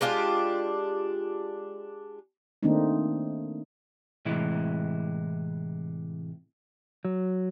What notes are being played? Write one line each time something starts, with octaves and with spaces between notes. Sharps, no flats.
G#3 D4 F4 G4
D#3 A3 A#3 C4 D4 D#4
A2 C3 E3 G#3 E4
F#3